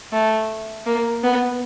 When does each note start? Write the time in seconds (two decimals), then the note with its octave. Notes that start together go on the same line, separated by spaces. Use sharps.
0.13 A3
0.86 A#3
1.24 B3